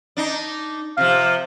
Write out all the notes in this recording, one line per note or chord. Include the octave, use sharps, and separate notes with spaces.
D4 D#4
C3 F3 F5